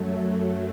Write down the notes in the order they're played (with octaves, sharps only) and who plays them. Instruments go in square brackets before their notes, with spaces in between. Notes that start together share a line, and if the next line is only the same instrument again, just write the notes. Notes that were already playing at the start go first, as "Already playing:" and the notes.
Already playing: [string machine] F#2 F#3 A3